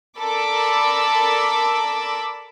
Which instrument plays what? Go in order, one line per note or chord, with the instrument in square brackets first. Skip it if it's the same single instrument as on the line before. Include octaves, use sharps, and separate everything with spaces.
[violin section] A4 A#4 D5 B5 D6 E6